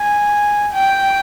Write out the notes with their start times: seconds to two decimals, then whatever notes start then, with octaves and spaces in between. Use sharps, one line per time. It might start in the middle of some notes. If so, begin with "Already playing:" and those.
Already playing: G#5
0.74 G5